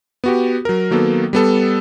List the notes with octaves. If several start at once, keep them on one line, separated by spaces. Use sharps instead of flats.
B3 F#4 G4
F#3 A#4
D#3 F#3 A#3 B3 A4
G3 B3 A4